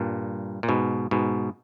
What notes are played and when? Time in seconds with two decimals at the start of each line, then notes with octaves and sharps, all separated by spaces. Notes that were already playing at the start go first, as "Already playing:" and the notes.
Already playing: G2 A#2
0.63 A#2
0.69 G#2 B2
1.11 G#2 B2